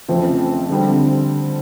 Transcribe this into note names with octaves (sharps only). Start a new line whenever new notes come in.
F2 C#3 F3 A3 C4
D3 G3 C4